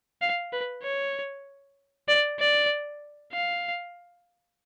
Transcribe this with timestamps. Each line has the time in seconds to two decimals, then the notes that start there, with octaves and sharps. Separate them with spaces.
0.22 F5
0.53 B4
0.83 C#5
2.09 D5
2.40 D5
3.33 F5